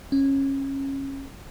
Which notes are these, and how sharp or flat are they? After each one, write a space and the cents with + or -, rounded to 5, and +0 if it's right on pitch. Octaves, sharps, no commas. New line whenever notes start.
C#4 -20